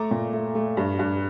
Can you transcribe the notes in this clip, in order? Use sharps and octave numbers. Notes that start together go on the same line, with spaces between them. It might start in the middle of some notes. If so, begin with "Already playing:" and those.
Already playing: A3 A#5 D6
A#2
A3
A3
G2
G2